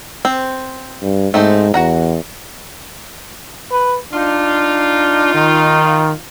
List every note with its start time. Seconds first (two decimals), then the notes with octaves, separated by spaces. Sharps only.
0.25 C4
1.02 G2
1.34 G#2 A3 C4 D#4
1.74 E2 F#4 F#5 A#5
3.72 B4
4.13 D4 D#4 F4
5.34 D#3